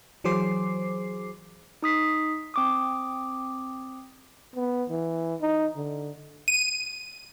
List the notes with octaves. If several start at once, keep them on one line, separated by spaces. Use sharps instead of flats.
E3 F#3 G#4 C5 D6 C7
D#4 D#6 B6 C7
C4 D6 D#6
B3
E3
D#4
D3
D#7